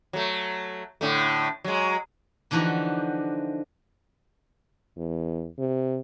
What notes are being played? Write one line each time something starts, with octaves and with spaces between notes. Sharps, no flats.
F#3 A3
A2 D3 A3
F#3 G#3
D3 E3 F3 D#4 F#4 G4
E2
C3